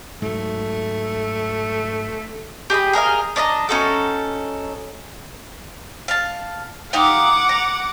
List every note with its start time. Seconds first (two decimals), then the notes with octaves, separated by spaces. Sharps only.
0.22 G#2 F#3 A3
2.70 G4 G#4 D#5 B5
2.93 G#4 A#4 D#5 F5
3.36 D4 D#5 E5 A#5
3.69 C#4 D#4 F#4 A4
6.08 F5 A5
6.93 D#4 G4 F5 F#5 D6
7.49 A#5